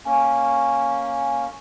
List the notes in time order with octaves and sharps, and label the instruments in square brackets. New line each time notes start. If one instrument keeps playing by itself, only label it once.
[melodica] A#3 C#4 [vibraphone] G#5